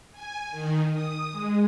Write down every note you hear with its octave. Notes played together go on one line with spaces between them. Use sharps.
G#5
D#3
D#6
G#3